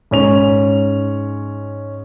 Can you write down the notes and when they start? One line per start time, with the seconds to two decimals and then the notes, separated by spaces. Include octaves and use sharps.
0.11 G#2 C#4 F7